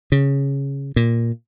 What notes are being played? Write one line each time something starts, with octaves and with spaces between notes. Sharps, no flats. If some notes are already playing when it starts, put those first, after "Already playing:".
C#3
A#2